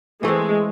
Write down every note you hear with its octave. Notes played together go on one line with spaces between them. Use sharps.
E3 G#3 A3 C4